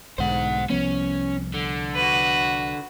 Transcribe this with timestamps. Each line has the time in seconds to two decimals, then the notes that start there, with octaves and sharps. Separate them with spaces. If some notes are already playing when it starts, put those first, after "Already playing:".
0.18 B1 G#2 D3 C5 F#5
0.70 C2 F3 B3 C#4
1.54 D3
1.95 F#4 B4